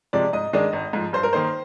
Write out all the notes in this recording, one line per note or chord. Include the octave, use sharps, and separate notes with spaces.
C3 F3 G#3 D5
G#2 D#5
D#3 G#3 D4 D#5
G#1
G#2 F3
G2 C5
A#4
D#3 A#3 D#4 C5